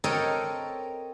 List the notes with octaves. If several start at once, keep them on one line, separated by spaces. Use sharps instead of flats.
C4 A4 A#4 C#5 D#5 G5